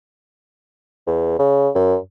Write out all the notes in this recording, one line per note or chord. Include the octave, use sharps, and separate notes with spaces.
E2
C#3
F#2